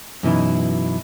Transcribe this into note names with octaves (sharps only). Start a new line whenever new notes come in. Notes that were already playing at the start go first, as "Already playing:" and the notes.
F#2 B2 E3 D#4 E4